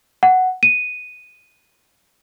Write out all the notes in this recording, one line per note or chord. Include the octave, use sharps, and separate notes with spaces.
F#5
D#7